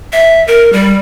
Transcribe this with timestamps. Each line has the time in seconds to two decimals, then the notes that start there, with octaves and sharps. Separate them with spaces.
0.13 E5
0.48 A#4
0.73 G3